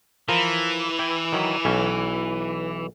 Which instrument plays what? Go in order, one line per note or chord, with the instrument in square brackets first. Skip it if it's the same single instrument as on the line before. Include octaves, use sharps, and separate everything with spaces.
[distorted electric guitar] E3 [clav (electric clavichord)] F3 A#4
[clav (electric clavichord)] E4 G5
D#3 F#3
B1 C#4